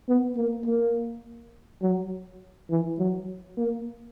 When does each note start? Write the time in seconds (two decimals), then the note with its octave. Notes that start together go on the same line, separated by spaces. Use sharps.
0.08 B3
0.37 A#3
0.66 A#3
1.82 F#3
2.70 E3
2.99 F#3
3.57 A#3